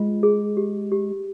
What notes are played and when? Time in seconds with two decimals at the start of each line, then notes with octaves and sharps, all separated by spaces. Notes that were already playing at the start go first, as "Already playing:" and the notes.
Already playing: G#3 F4
0.23 G#4
0.57 G4
0.92 G4